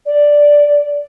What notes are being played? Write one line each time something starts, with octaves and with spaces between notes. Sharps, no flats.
D5